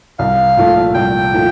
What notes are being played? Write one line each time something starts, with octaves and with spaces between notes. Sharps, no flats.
C2 F5
A#2 F3 A3
C2 G5
A#2 F3 A3